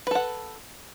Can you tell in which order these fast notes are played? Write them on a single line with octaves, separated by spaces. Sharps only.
B4 A4 F#5